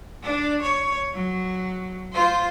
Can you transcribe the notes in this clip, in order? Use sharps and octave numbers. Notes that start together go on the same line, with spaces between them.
D4
C#5
F#3
F4 C5